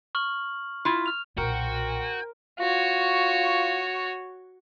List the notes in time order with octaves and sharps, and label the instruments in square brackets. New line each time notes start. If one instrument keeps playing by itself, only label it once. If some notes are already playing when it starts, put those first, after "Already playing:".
[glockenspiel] C#6 F6 F#7
[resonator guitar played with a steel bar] E4 F4
[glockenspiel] F6 F7
[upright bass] B1 A#2 [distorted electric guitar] F#4 [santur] A#4 C5 [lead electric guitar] G5
[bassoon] F4 [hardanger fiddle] F#4 C#5